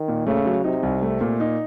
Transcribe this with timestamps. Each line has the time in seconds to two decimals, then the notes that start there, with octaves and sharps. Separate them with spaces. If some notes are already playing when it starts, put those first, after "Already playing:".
Already playing: D#3
0.08 A#2
0.27 C#3 A3
0.45 F#3
0.64 C3 D#4
0.83 C2
1.02 A3
1.21 A#2
1.40 D#4